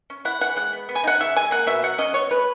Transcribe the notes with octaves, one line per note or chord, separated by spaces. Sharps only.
C#4
E4 F#5
E3 F#5
G#3 F#5
B3
B3
G#5
D#4 F#5
C#3 E5
G#3 G#5
A#3 F#5
B2 E5
F#3 F#5
C#4 D#5
B3 C#5
G#3 B4